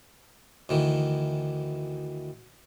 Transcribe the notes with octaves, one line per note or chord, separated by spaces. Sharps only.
D2 D#3 E3